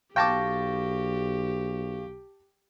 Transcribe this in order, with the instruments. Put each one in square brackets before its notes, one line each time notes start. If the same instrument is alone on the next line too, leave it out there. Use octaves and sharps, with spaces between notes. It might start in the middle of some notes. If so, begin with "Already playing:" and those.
[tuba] B1 [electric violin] G4 [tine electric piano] F5 C#6 A#6 [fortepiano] G5 A5 D6